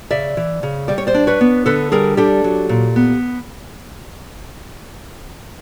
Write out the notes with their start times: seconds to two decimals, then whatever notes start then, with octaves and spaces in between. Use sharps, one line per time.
0.11 C#3 D5 E5
0.37 E3
0.63 C#3
0.88 G3 D5
0.98 C#5
1.07 C5 D5
1.14 D4
1.27 B4 C#5
1.41 B3
1.66 D3 A4 B4
1.92 G3 G#4 A#4
2.17 D4 G4 A4
2.44 F#3
2.69 A#2
2.96 B3